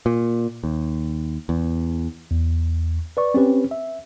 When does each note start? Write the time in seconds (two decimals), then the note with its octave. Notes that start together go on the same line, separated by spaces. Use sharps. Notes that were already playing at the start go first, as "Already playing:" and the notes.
0.06 A#2
0.64 D#2
1.49 E2
2.31 E2
3.17 B4 D5 C#6
3.34 C4 C#4 G4 B4
3.71 E5